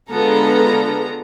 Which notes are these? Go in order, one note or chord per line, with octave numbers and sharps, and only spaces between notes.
D3 G#3 B3 F4 A4 A#5